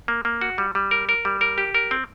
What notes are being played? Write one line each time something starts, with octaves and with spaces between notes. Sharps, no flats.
A#3
A#3
F#4
G3
G3
A#4
A#4
G3
A#4
G4
A#4
C4